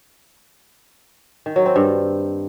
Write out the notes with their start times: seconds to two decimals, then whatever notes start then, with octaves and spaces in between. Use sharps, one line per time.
1.46 D#3
1.56 F#3
1.66 C4
1.76 G2